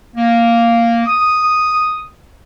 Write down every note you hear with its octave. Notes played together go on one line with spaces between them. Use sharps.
A#3
D#6